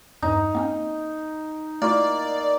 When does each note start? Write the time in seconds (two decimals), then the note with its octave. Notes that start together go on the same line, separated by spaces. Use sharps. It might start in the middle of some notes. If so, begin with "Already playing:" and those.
0.22 E2 G2 D#4
0.55 A#3 C4 C#4
1.82 A3 A#3 E4 F4 D5